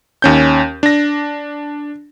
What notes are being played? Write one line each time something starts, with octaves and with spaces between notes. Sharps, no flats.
D#2 C#4 G6
D4 A#6